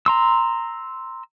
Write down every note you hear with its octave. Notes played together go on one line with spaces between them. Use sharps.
A#5 C6 E6